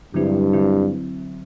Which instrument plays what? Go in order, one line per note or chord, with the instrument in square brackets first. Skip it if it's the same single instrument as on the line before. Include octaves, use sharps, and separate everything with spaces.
[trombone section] G2 [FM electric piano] D3 F#3 C4 E4
[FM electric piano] D3 F#3 C4 E4